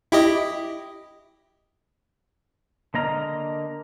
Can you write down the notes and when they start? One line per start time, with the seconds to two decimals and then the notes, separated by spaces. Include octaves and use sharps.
0.12 E4 G4 D#5
2.94 D3 A#3 D#5 A#5 F6